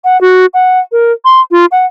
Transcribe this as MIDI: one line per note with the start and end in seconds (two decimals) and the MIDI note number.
0.04 0.20 78
0.21 0.46 66
0.54 0.79 78
0.92 1.12 70
1.25 1.41 84
1.51 1.65 65
1.71 1.86 78